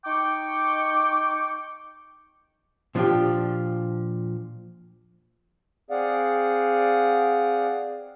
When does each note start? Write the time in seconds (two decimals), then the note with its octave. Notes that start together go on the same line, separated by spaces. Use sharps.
0.05 D#4 G5 C#6 D6
2.95 A#2 F3 D4 D#4 F4 G4
5.90 C4 G#4 D5 F5 F#5